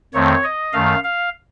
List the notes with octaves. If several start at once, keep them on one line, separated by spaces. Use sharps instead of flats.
F2 D#3 A3 C4 C#5
D#5
F#2 D#3 A3 F5
F5